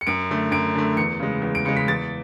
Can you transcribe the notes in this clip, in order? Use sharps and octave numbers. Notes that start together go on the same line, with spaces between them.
C#7
F#2 D7
D3 A3
F#2 D7
D3 A3
E2 C#7
C#3 G#3
E2
D7
C#3 G#3 C#7
B6
E2 A6